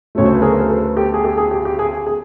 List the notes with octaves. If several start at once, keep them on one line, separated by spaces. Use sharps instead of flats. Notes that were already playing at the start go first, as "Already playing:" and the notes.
D2 C#3 F#3 A3 C#5
C5
B4
G#4 A#4
C5
A4 B4
G4 A4
G#4
G4 A4
G#4
G4
G4
G#4
G#4